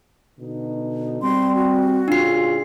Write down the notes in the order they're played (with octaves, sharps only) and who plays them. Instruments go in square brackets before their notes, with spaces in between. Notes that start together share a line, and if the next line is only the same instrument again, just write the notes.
[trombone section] B2 D3 D#4
[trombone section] G3 [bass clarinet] C4 [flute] C6
[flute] F#4
[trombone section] A2 C#3 G#4 [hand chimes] D4 C7 [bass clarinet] F4